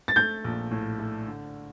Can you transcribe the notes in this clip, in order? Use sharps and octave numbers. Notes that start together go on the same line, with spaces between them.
A6
A3 G6
A#1
A2
A3
D3